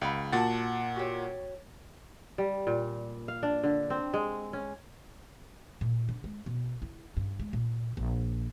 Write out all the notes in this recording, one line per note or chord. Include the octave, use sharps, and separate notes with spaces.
C#2 F5 F#5 B5
A#2 F#4 F#5 A5 A6
F#4 G4 C#5
G3
A#2
F5
D4
D3
C4
G#3
C#4
A#2
D3
G#3
B2
E4
G2
G#3
A#2
A#1